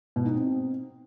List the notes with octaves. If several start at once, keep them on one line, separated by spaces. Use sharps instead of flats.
B2
D#4
C4